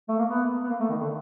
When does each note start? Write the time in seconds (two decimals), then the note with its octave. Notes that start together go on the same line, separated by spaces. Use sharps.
0.09 A3
0.18 A#3
0.29 B3
0.64 B3
0.69 A#3
0.80 A3
0.89 D#3
1.01 D3